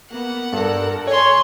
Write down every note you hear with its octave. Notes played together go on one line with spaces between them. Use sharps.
A#3 B3 F#5
G2 A4 A#4
C#5 G#5 C6 C#6